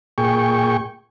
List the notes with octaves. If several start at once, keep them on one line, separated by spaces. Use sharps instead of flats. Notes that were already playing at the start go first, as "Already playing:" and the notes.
A#2 G#4 G5 C#6